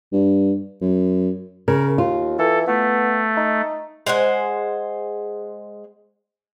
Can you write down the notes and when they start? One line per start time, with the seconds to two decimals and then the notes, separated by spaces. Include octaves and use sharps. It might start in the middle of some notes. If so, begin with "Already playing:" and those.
0.13 G2
0.81 F#2
1.68 C#3 A#4
1.98 D#2 F4
2.39 E3 A4
2.67 A3 B3
3.37 D#4
4.06 G#3 C5 F#5 G#5